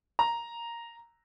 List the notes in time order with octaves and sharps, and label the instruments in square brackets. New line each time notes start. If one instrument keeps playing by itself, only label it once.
[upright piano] A#5